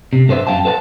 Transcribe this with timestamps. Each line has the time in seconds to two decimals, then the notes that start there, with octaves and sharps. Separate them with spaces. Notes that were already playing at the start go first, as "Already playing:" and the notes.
0.13 C3
0.28 G2 A4 B4 C5 E5
0.47 F#2 A#3 F5 G5 A5
0.65 A4 B4 C5 F5 A5